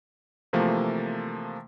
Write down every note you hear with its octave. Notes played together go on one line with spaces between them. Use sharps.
C3 E3 F3 A3 A#3